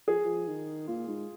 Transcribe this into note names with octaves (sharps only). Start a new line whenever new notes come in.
F3 G#4
F3
D#3
A#2 F4
G#2